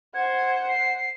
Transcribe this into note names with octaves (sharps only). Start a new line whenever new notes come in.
C5 F#5 G#6
C7